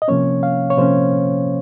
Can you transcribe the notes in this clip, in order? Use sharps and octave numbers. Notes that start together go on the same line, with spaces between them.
D#5
C3 F3 A#3 C#4 C#5
F5
C#5
C3 F3 A#3 C#4 C5